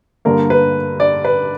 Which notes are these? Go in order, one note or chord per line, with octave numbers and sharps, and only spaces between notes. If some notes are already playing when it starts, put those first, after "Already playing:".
G2 D3 A#3 A#4
B4
D5
B4